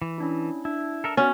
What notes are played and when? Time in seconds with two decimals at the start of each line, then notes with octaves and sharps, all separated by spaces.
0.02 E3
0.18 C#4 D4 E4
0.65 D4 E4
1.04 A4 A#4 E5
1.17 B3 C#4 F#4 D5 F6